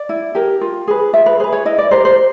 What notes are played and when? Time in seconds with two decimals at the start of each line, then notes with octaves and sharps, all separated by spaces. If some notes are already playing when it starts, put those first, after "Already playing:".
Already playing: D5
0.09 E4
0.35 G4 A#4
0.61 F4
0.88 G#4 B4
1.13 F4 E5
1.26 B4
1.39 G#4 C5
1.44 B4
1.53 C#5
1.65 E4 D#5
1.78 D5
1.91 G4 A#4 C5
2.05 C5